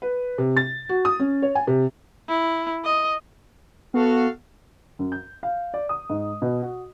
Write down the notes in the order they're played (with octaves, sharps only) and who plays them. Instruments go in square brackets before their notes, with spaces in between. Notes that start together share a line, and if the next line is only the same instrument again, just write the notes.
[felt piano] B4
C3
A6
F#4
D#6
C#4
C#5
G#5
C3
[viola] E4
D#5
[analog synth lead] B3 [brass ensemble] F#4 A4 F5
[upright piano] F#2
G6
F5
D5
D#6
G#2
B2
F#4